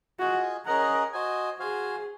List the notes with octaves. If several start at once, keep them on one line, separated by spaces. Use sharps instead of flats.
F4 F#4 G#4 D#5 G#5
C#4 G#4 A#4 D#5 F#5
F#4 C5 D#5 G#5
F#4 G#4 C5 F5 G#5